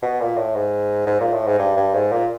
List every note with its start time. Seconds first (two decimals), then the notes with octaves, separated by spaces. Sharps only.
0.03 B2
0.20 A#2
0.37 A2
0.55 G#2
1.07 G#2
1.20 A#2
1.33 A2
1.47 G#2
1.59 G2
1.77 G2
1.94 G#2
2.12 A#2